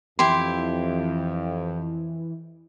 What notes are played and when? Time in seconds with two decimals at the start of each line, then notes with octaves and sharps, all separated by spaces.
0.19 F2 E3 E4 G4 C6